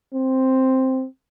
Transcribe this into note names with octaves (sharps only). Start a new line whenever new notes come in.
C4